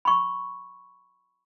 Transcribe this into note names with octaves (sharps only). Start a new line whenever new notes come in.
B5 C#6